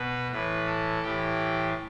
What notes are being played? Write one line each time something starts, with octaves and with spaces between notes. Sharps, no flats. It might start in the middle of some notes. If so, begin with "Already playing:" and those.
Already playing: B2 B4
A2 E3 B4
A4
A2 E3 G4